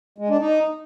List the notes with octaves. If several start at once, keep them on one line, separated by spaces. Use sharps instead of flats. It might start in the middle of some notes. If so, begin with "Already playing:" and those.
G#3
D4
D#4